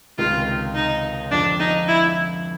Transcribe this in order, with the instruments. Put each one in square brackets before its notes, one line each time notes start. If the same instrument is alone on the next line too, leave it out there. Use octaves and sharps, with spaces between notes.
[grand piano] C#2 C3 D#3 G#3 [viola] F4
[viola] D#4
[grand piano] F2 D3 F3 [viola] D4
[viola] D#4
E4